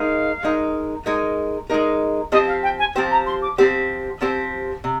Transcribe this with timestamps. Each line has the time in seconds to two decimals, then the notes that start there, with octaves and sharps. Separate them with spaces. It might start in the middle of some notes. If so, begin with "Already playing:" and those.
Already playing: G#3 D#4 A#4 F5
0.43 G#3 D#4 A#4
1.06 G#3 D#4 A#4
1.70 G#3 D#4 A#4
2.32 F3 C4 G4 C5 D#5
2.47 F5
2.63 G5
2.79 G#5
2.95 F3 C4 G4 C5 G5
3.11 A#5
3.26 C6
3.42 D6
3.58 F3 C4 G4 C5
4.21 F3 C4 G4 C5
4.84 C3